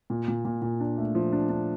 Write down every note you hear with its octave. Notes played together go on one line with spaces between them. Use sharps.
A#2
A#2
A#2
A#2
D4
A3
F3
D4
D4